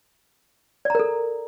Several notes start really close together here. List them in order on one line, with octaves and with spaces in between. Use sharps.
D5 A#5 A#4 A4